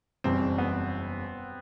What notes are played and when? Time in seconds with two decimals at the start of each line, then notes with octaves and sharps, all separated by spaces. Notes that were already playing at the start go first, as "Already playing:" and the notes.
0.24 F#1 E2 B2 G3 C4
0.58 B3